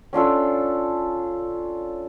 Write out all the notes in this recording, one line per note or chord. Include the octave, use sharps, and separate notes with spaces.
C#4 D4 F4 A4